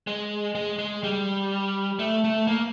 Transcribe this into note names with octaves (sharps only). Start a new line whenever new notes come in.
G#3
G#3
G#3
G3
A3
A3
A#3